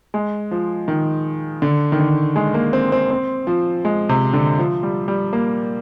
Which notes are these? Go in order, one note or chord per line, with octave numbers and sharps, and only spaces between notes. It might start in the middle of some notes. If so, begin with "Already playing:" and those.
G#3
F3
D#3
D3
D#3
D3
G#3
A#3
C4
C4
C4
F3
G#3
C3
D3
F3
G3
G3
A#3